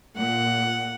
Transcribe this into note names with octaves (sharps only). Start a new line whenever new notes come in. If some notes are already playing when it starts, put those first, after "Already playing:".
A#2 F#5